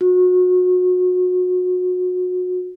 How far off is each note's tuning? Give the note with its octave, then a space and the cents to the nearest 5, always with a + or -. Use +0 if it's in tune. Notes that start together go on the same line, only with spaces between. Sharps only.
F#4 -30